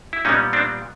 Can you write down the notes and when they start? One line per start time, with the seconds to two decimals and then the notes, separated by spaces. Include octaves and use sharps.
0.13 E4
0.25 A#2 G3 B3 C#4 D#4
0.53 C4 D4